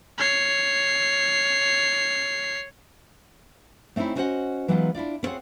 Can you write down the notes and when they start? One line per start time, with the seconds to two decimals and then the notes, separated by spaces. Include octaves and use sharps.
0.18 C#5 C7
3.96 A3 C4 C#4 D#4 E4
4.15 B3 C#4 F#4 C5 D#5 F#5
4.68 E3 F#3 G#3 B3 D#4 F4
4.95 D4 E4 F4 D5
5.23 B3 C4 F4 G#4 C#5 F#5